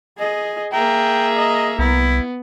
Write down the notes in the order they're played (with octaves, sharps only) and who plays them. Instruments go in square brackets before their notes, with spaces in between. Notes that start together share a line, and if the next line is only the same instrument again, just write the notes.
[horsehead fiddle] G#4 D#5
[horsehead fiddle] A#3 A#5 [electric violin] G#4 E5 [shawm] G5
[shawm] D#5
[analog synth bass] C2 [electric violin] B3 [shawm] E4